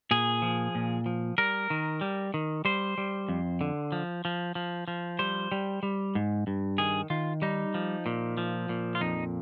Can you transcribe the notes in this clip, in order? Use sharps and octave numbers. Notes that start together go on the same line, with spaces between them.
A#2 G#4
F3
A#2
F3
G3 A#4
D#3
G3
D#3
G3 C5
G3
F2
D3
F3
F3
F3
F3
G3 C5
G3
G3
G#2
G2
D#3 G#4
D#3 F4
G3 D#4
F3
A#2
F3
A#2
F4
F2 D#4